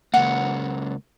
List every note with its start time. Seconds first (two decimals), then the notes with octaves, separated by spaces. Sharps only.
0.14 C#2 A#3 F#5